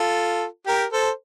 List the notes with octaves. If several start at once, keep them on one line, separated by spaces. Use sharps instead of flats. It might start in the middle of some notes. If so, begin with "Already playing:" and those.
Already playing: F4 A4
G4 A#4
A4 C5